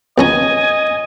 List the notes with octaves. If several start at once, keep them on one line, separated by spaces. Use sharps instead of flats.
A#1 C#4 D#5 G#5 A#5